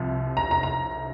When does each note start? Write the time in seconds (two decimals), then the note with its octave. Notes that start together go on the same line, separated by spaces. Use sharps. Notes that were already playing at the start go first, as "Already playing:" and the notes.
Already playing: C2 C3 F3
0.37 A#5
0.51 A#5
0.63 A#5